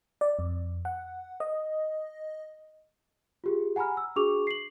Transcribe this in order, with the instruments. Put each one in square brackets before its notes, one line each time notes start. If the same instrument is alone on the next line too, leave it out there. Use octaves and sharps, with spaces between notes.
[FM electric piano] D5
F2
F#5
D#5
[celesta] F4 G4 G#4
F#5 G#5 A#5 B5 F6
E6
D4 F#4 G#4 C#6 D6 F7
C7 F#7